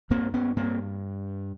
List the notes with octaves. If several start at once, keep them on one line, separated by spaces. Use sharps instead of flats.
G2 A#3 C4
B3 C#4
G2 A#3 C4